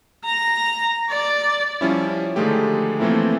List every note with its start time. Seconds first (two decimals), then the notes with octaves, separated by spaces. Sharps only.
0.25 A#5
1.10 D5
1.81 F3 G3 C#4 E4
2.36 D3 D#3 F3 G#3 A3 G4
2.99 E3 F3 A3 A#3 C4 E4